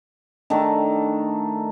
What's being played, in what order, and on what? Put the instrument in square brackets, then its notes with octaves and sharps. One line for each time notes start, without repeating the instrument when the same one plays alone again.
[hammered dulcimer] D#3 A3 D4 A4